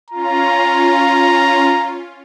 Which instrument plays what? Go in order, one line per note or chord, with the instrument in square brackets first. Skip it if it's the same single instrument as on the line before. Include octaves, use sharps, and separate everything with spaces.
[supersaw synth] C#4 F4 [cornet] A#5